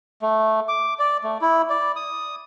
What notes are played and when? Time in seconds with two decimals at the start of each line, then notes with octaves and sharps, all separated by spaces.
0.22 A3
0.68 D6
0.99 D5
1.24 A3
1.42 E4
1.70 D5
1.96 D#6